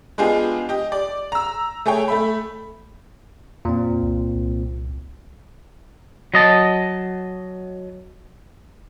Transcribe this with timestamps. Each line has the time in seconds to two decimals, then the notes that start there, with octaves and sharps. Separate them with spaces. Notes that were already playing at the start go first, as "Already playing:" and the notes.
0.18 G#3 B3 D4 F4 G4 G#4
0.69 G4 D#5
0.92 D5
1.32 A#5 E6
1.86 A3 G#4 C#5 G5
2.08 A3 E5 B5
3.65 F2 A#2 C4
4.02 C2
4.35 C2
6.34 F#3 D#5 A5